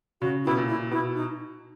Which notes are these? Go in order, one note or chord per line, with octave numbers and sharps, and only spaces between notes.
C#3 F#4
B2 E4
A#2
E4
B2 E4
D#4